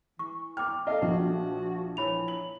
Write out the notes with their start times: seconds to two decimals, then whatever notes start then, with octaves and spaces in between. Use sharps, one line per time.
0.19 E3 C#6
0.57 G5 D6 F6
0.87 A4 D#5 F5
1.01 A#1 F3 F#4
1.97 E3 C#5 B5 F7
2.28 F#7